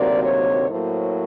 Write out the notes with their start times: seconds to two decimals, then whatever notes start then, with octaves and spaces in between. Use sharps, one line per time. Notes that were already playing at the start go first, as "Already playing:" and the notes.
Already playing: D2 C3 D#3 F#3 A#3 D5
0.23 C#5
0.69 A2 F#3 A#3 C5